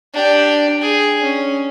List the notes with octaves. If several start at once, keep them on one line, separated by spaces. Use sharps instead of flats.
D4 G4
G#4
C#4